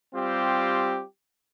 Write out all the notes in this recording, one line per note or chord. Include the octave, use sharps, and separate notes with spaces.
G3 C4 F4 G4